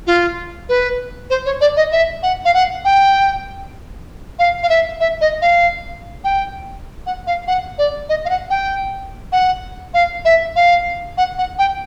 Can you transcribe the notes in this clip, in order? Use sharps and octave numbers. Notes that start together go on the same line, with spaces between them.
F4
B4
C5
C#5
D5
D#5
E5
F#5
F5
F#5
G5
F5
F5
E5
E5
D#5
F5
G5
F#5
F5
F#5
D5
D#5
F5
F#5
G5
F#5
F5
E5
F5
F#5
F#5
G5